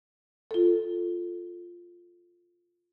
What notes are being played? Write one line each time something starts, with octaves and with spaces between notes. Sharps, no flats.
F4 A4